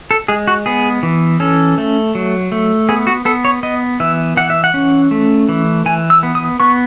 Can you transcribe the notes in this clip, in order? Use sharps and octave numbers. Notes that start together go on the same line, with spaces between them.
A4
G#3 G#4
F#4
B3 G#4
E3
C#4 A4
A3
F#3
A3
B3 G#4
F#4
B3 A4
C#5
B3 D#5
E3 E5
E3 F#5
E5
F#5
C#4
A3
E3
E3 G#5
E6
B3
D#6
B3 C#6